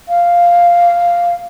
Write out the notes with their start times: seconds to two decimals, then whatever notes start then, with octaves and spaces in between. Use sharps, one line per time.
0.09 F5